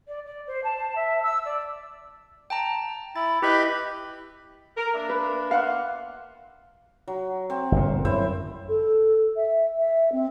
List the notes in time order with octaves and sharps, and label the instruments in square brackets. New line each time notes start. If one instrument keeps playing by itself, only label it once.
[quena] D5
D5
C5
A5
E5
E6
D5
[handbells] G5 A5 A#5
[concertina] E4 [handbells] A6
[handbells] E4 D#5 G6 [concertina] G4 B4
[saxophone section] A#4
A#3 D4 E5
[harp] B4
F5 F#5 C6
[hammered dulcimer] F#3
C4
[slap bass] G1 A#2
[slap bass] F#2 [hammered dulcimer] E4 C5 E5
[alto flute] A4
E5
E5
C4